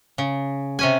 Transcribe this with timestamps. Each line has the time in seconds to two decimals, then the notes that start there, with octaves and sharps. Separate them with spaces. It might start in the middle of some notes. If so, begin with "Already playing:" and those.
0.18 C#3
0.79 C3 C#4 G#5